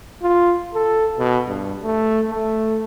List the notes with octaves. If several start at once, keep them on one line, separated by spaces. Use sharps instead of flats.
F4
A4
B2
G2
A3
A3